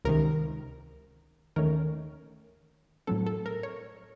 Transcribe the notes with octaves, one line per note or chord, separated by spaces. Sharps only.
C#2 C3 D#3 A#4
D#2 D#3 A3 C#4 A#4
A2 F#3 C4 A4
A4
A#4
C#5